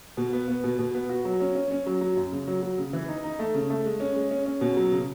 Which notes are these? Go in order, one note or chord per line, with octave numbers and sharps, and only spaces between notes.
B2
B3
B3
B2
B2
B3
F#4
F#3
C#4
C#4
C#4
F#3
F#3
F#2
C#3
F#3
F#3
C#3
E3
D#4
D#4
A3
C#3
A3
G#3
C#4
G#3
C#4
C#4
B2
F#3
C#3